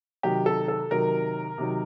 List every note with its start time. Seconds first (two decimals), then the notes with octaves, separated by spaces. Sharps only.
0.23 C3 D#3 F#3 G4
0.46 A4
0.68 A4
0.91 C3 D#3 F#3 A#4
1.58 C3 D#3 F#3